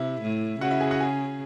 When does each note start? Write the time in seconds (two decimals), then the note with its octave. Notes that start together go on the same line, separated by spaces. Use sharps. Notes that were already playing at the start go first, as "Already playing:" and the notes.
Already playing: C3 E4 E5
0.22 A2
0.61 C#3 F#4 F#5
0.71 E4 E5
0.80 G#4 G#5
0.91 F#4 F#5
1.00 G#4 G#5